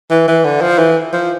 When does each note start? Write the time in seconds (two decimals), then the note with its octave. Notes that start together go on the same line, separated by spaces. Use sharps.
0.10 E3
0.28 E3
0.45 D3
0.61 F3
0.78 E3
1.13 F3